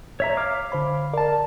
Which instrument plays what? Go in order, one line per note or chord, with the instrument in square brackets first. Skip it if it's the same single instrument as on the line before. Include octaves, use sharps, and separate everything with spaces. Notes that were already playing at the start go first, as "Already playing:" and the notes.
[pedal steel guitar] C#5 E5 A#5
F5 D6 F6
[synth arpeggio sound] D3 C5 B5
[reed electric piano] A#4 A5 [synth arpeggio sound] D5